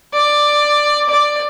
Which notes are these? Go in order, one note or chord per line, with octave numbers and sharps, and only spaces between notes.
D5
D5